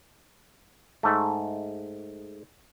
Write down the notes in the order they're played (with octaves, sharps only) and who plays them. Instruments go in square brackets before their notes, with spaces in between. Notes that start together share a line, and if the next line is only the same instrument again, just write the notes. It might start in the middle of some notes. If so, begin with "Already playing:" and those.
[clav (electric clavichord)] G#2 A3